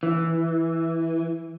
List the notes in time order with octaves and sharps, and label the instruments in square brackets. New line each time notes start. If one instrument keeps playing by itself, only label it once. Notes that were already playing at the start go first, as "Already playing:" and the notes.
[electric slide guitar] E3